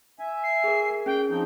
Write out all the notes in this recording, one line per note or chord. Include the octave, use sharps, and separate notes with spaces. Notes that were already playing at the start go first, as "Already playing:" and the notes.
E5 G#5
C7
G#4 A#4
C#4 G#4 G5
F3 C4 D#4 G6